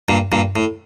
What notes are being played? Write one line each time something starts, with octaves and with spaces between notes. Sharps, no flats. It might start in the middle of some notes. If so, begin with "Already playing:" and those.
G2 A#2
G2 A#2
A2